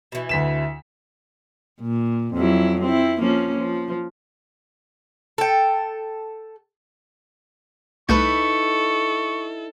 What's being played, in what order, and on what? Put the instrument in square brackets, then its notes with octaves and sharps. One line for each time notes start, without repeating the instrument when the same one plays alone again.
[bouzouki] B2 E3
[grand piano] D2 B6 E7
[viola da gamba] A#2
F2 F#3 E4
C4 E4
F3 A#3 C#4
F3
[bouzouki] A4 G5
[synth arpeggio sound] C2 A3 F#6 [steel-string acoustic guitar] D#4 E4 B4 [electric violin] A4 [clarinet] C#6